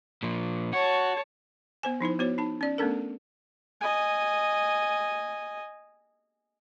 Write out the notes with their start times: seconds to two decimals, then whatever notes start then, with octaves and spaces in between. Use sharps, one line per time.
0.23 A#2 F3
0.73 F#4 C#5 A5
1.83 B3 C5 G#5
2.01 F3 D#4 E4 C5
2.19 B3 F#4 C5 C#5
2.38 D#4 A5
2.61 C#4 D5
2.78 A3 B3 C#4 D4 A4 A#4
3.81 D#5 G#5